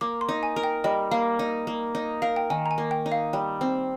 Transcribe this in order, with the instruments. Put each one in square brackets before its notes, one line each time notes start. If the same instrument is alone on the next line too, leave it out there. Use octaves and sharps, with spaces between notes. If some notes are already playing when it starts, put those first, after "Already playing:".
[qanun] A#3 [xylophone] D6
[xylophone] C6
[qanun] D#4
[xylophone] G#5
[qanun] A#4
[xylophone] G5
[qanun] G3 [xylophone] D#5
[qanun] A#3 [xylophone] F5
[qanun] D#4
A#3
D#4
[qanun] A#4 [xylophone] F5
[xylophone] G5
[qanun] D#3 [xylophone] G#5
[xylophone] A#5
G#5
[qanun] A#3
[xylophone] G5
[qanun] D#4
[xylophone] F5
[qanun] G3
C4